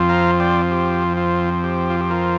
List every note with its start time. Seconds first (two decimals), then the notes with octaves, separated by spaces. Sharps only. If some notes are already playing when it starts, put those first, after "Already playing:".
Already playing: F2 F3 C4 F4
0.09 F5 A#5
0.40 D5 G5
0.71 G4
1.17 F4
1.64 G4
1.90 F4
2.00 G4
2.10 F4 A#4